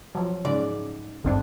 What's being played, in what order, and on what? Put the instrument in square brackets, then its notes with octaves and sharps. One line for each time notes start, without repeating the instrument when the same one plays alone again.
[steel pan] F3 F#3
[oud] G#2 D5 [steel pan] C#3
[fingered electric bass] G#1 D2 G2 [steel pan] D3 C4 D4